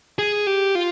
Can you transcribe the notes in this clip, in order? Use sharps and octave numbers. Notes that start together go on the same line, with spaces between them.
G#4
G4
F4